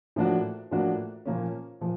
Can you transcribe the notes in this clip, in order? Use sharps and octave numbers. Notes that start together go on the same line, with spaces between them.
A2 F3 A#3 D4 F#4
A2 F3 A#3 D4 F#4
A#2 F3 A#3 C#4
A#2 F3